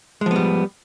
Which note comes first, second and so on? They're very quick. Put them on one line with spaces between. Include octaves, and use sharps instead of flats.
G#3 F3 B3 G3